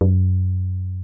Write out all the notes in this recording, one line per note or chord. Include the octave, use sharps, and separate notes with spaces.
F#2